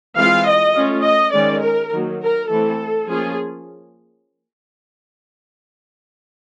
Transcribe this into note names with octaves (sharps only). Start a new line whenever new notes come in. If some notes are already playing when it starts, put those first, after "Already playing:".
E3 G#3 C4 F4 F5
D#5
A3 C#4 F4
D#5
D#3 G#3 C#4 D5
A#4
D#3 F#3 A#3
A#4
E3 A3 C4 E4 A4
F3 A#3 C#4 F4 G#4